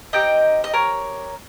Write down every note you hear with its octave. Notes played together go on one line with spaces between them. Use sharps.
C4 D#4 G4 D#5 G5
D#5
A#4 C#5